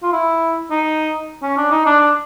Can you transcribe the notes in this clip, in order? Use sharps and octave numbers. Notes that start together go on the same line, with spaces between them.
F4
E4
D#4
C#4
D4
D#4
D4
D4